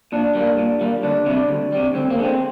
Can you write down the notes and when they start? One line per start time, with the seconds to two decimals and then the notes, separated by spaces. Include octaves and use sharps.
0.12 A#2 D4
0.35 G3 A#3
0.58 A#2
0.81 G3 A#3
1.03 D2 D4
1.26 C3 G3
1.49 D2
1.72 C3 G3
1.94 D2 C4
2.10 A#3
2.18 D3 G#3
2.25 C4